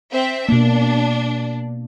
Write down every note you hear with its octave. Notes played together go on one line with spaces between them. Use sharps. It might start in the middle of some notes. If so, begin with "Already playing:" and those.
C4 E5
B2 A#3 D4